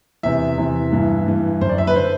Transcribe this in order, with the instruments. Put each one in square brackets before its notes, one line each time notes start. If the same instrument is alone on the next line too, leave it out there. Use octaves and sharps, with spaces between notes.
[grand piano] E2 C3 E3 E5
E2 C3 E3
G2 E3
G2 E3
F#2 D3 C5
D5
E5
B4
D3 C5